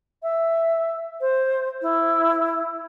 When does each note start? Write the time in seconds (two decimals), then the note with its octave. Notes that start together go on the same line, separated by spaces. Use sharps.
0.23 E5
1.21 C5
1.82 E4